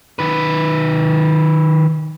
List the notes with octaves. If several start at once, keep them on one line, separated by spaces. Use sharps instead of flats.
D#3 B4